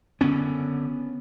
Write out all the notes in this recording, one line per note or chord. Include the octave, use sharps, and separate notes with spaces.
F#1 F#2 D3 B3 C#4